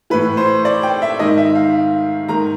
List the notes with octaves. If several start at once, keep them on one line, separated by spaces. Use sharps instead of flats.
A2 E3 B4
C5
D5
G5
E5
G#2 D#3 D#5
E5
F5
G#2 D#3 A#5